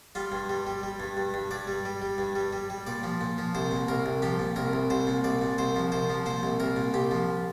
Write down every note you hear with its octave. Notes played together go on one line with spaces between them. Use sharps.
G3 F4
G2
G3
G3
G3
G2
G2
G2
G2 D5
G3
G3
G3
G2
G3
G3
G3
A#2 D5
F3
A#2
F3
C2 C5
A#2
C2 A#4
C2
F3 G4
A#2
C2 A#4
C2
C2 C5
A#2
C2 D5
A#2
C2 C5
F3
C2 C5
F3
A#2 C5
C2
C2 A#4
A#2
C2 G4
F3